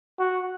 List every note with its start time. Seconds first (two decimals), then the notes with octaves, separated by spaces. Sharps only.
0.19 F#4